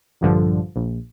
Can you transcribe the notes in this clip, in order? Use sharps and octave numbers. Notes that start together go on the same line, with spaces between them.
A#1 G2 D3 F3
A#1